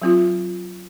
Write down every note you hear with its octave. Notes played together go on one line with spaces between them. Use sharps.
F#3 C4 F4